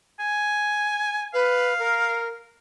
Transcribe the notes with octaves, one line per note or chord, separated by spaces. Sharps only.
G#5
B4 F5
A#4